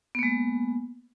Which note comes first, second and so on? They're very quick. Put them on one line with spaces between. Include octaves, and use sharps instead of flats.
B3 A#3 G#3